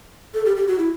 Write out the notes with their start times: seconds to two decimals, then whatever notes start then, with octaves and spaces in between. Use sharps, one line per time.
0.34 A4
0.45 G4
0.57 G4
0.68 F#4
0.79 E4